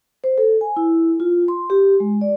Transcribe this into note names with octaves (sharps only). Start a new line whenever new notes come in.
C5
A4
G#5
E4
F4
C6
G4
G#3
D5